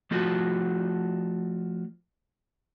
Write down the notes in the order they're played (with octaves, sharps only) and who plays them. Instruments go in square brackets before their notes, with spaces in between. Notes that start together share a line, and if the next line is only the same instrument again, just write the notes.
[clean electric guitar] F3 A3 F4 F#4 A4